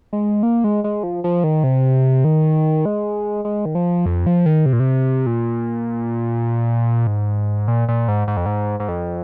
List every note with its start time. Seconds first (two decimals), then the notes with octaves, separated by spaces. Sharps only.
0.13 G#3
0.43 A#3
0.64 G#3
0.84 G#3
1.03 F3
1.24 F3
1.44 D#3
1.64 C3
2.24 D#3
2.86 G#3
3.45 G#3
3.65 D#3
3.75 F3
4.06 F2
4.26 F3
4.46 D#3
4.66 C3
4.73 A#2
4.80 C3
5.27 A#2
7.07 G#2
7.68 A#2
7.88 A#2
8.08 G#2
8.28 G#2
8.37 F2
8.46 G#2
8.80 G#2
8.88 F2